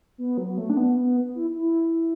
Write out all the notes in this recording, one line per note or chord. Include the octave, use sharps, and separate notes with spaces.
B3
F#3
A3
D4
B3
B3
E4
E4